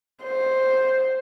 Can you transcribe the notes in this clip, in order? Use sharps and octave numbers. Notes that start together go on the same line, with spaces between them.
C5